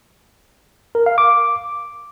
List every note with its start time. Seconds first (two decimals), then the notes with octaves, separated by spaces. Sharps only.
0.95 A#4
1.06 F5
1.18 D6